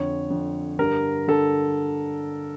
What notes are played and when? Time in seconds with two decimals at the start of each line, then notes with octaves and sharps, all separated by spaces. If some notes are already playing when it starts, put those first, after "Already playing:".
Already playing: F2 D3 C#5
0.30 F2 D3
0.78 G2 D3 A#4
1.28 D3 A4